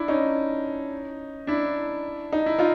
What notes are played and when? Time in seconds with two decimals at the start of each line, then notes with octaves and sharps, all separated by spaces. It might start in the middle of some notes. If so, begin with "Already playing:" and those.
Already playing: D4 E4
0.08 C#4 D#4
1.47 D4 E4
2.33 D#4
2.46 E4
2.59 D#4 F4